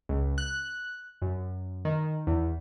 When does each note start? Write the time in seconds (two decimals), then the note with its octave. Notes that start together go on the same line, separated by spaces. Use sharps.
0.09 C#2
0.38 F#6
1.22 F#2
1.85 D#3
2.27 E2